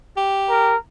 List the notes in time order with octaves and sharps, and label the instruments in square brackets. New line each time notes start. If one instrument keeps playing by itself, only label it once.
[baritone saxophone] G4
[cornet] A#4